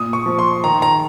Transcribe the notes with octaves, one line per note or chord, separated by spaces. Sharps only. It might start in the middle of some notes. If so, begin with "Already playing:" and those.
Already playing: A#2 D#6
C#6
F3
C6
D#3 A#5
A#5